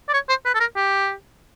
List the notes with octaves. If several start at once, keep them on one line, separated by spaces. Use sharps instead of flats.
D5
C#5
C5
B4
A4
A#4
G4